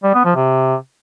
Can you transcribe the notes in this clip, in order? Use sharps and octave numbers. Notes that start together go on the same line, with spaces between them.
G3
B3
F3
C3